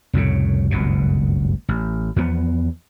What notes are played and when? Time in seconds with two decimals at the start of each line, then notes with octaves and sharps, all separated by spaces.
0.13 C2 F2 A2 C#3
0.71 F#1 C#2 G2 B2
1.69 A1
2.16 E2 F3 F#3 B3